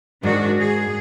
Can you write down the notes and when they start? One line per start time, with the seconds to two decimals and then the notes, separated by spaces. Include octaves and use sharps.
0.23 G#2 D#3 D4 F#4
0.57 G#4